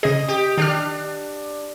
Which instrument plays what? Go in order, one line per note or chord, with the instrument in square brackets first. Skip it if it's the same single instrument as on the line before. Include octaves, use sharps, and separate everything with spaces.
[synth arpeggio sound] C#3 G#4 [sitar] D#5
[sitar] G4
[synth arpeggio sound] D#3 G4 F6 [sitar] D4